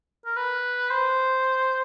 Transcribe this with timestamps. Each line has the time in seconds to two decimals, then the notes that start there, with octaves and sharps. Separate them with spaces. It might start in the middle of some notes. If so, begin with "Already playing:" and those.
0.25 A#4
0.36 B4
0.91 C5